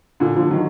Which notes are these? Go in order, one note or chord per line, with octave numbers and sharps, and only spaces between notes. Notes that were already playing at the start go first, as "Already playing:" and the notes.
A#2 D3
D3 F3
D#3 F#3